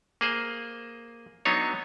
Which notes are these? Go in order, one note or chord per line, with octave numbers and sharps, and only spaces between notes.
A#3 G#4 C5
F#3 B3 D4 D#4 C#5